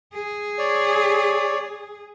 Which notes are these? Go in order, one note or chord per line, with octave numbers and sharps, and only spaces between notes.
G#4
C#5 D5